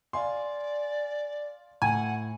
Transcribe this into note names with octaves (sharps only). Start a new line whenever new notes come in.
D5 F5 G#5 C6
A2 F#5 G#5